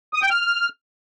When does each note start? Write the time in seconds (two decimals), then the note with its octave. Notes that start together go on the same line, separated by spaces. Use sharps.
0.14 D#6
0.22 G5
0.31 F6